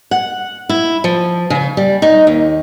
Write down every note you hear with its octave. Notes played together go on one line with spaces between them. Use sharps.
F#5
E4
F3
C#3
G3
D#4
D#2